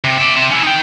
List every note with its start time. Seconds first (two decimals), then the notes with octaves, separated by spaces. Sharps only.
0.04 C3
0.18 D5 E5
0.36 C4 E5
0.51 C#4 E4
0.63 D#4 G5